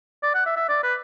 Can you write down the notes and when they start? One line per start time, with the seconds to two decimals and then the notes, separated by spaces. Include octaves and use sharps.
0.23 D5
0.34 F#5
0.46 E5
0.56 E5
0.68 D5
0.83 B4